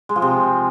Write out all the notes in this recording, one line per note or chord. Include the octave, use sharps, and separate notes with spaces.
G#3
F3
C3